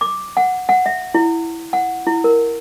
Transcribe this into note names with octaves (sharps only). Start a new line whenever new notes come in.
D6
F#5
F#5
E5
E4
F#5
E4
A#4